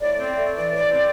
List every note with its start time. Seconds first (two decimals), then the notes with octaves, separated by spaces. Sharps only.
0.02 A2 D5
0.19 C4
0.36 A3
0.54 E3
0.71 A2
0.89 C4